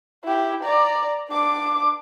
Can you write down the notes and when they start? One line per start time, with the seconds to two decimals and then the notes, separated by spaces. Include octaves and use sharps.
0.25 E4 G4
0.64 D5 A#5
1.30 D4 D6